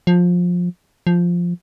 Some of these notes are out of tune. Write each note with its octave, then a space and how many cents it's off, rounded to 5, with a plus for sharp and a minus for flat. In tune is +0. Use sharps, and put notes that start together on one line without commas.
F3 +20
F3 +0